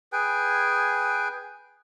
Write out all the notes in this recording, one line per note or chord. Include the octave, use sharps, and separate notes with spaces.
G#4 B4 G5 G#5